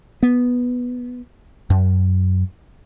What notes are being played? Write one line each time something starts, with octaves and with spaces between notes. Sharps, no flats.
B3
F#2